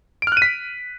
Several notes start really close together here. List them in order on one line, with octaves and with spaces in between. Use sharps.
D7 F6 F#6 D#7 B6